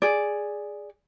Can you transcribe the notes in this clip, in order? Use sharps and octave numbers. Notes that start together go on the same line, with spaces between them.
G#4 D5